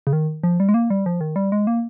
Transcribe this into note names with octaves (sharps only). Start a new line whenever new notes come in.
C#3
D#3
F3
G3
G#3
A#3
G3
F3
D#3
G3
G#3
A#3